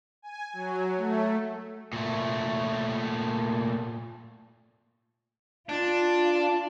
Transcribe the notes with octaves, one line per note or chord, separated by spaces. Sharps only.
G#5
F#3
A3
A#2 A3
D4 F4